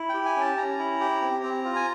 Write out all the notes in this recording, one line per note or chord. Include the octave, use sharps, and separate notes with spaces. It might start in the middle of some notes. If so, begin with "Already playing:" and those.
Already playing: E4
G4 G5
G#5
C#4 A5
C#4 A#5
E4
G4
C4
C4
F4
G#5